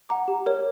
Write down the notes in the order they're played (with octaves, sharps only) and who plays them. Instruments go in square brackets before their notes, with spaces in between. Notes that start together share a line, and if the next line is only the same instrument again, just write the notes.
[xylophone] F#5 A#5 D6
G4
A#4 C#5